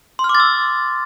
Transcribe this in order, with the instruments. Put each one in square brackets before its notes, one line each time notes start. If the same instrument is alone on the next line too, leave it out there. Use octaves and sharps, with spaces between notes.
[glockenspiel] C6
F6
D6
A6
E6